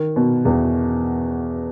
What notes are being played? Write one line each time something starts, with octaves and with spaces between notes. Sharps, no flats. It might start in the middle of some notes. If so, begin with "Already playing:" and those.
Already playing: D#3
B2
E2